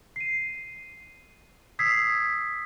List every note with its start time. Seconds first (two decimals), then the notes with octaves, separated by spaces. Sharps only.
0.16 C7 D#7
1.79 D#6 E6 G#6 B6 C7